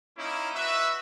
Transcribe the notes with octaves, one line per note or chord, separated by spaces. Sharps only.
A#3 C#4 D#4 E4
F#4 B4 E5